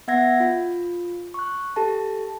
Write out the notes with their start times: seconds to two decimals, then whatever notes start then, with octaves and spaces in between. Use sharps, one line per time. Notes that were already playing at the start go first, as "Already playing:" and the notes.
0.08 B3 E5 F#5 G#6 A#6
0.40 F4
1.34 C#6 F#6
1.76 G4 A4 A5